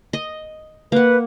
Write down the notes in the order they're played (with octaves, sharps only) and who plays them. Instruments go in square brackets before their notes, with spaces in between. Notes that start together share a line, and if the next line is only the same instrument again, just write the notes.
[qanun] D#5
[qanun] A#3 F#5 [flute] B4